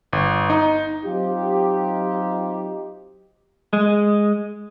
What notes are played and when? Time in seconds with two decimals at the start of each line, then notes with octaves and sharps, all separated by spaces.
0.13 G1
0.50 D#4
1.05 F#3 C4 D#4 F4 G4
3.73 G#3